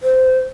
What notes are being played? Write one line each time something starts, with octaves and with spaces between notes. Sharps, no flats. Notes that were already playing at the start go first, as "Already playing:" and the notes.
C5